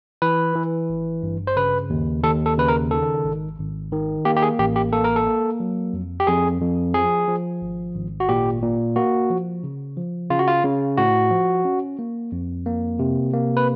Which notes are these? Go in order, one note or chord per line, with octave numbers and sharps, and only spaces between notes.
E3 B4
E3
G#1
G2
C5
C#3 B4
D#2
D#2 A4
A4
C#3 B4
A#4
D#3 A4
G#1
G#1
D#3
A#3 G4
G4
G#4
A1 G4
G4
A#3 A4
A#4
A4
A#3
F#3
F2
G4
F2 G#4
F2
F3 G#4
F3
G#1
G#1
F#4
A#2 G4
A#2
A#3 F#4
F3
C#3
F3
C#3 F4
F#4
F4
C#3
A2 F#4
F3
C#4
A#3
F2
A#3
C3
A#3
B4